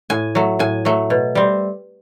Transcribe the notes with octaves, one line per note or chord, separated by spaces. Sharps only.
A2 G#5
F#3 A3
A2 G#5
F#3 A3
B2
G3 C4